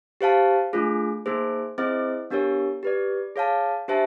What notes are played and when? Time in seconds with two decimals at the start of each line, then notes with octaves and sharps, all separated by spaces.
0.21 G4 C5 F5 A5
0.73 A3 D4 F4 G#4
1.26 A#3 D#4 G#4 C5
1.78 C4 E4 G#4 C5 D#5
2.30 B3 D4 G4 A#4 C#5
2.83 G4 B4 D5
3.36 G#4 C#5 F5 A5
3.88 D4 G4 C5 E5 A5